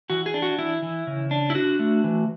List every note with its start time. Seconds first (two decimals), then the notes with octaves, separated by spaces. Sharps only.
0.10 E3 F#4
0.26 G#4
0.34 D4
0.42 F#4
0.58 E3 E4
0.82 E3
1.07 C#3
1.31 D4
1.50 E4
1.55 D4 F#4
1.79 A3
2.04 E3